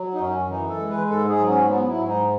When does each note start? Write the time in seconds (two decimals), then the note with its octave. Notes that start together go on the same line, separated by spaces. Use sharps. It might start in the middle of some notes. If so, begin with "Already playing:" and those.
Already playing: F#3
0.14 D#4
0.21 F#2 C#4
0.49 E3 D#4
0.69 A4
0.79 G#3
0.90 B4
1.09 G#2 A4
1.28 G#4
1.39 F#3
1.49 C#4
1.68 F#3 B3
1.88 E4
1.99 G#2
2.08 D#4